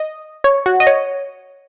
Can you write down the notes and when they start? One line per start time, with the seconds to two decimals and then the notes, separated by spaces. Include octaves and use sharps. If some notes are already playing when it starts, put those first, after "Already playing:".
Already playing: D#5
0.44 C#5
0.66 F#4
0.80 D#5
0.87 C#5